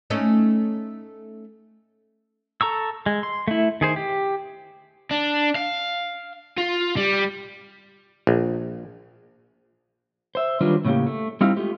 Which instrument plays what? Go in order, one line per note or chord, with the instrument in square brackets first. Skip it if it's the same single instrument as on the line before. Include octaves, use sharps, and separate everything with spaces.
[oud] A3 C#4 D#4
[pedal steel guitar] A4 A#5 C#6 E6
G#3
C6
A3 E4
D#3 G#4 C5
G4
[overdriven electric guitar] D4
F5
F4
G3
[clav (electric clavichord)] A#1
[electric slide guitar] C5 E5
D#3 F#3 G3 D4 F4 B4
A2 C#3 G#3 A#3 G4
A3
G3 C4 D#4 E4 F5
G#3 A3 F4 G4